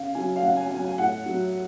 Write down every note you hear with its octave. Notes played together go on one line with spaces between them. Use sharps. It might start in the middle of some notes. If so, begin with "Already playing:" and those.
Already playing: C#3 F5
F#3 G#5
F5
C#3 F#5
G#5
F#3 G#5
G#5
A2 F#5
F#3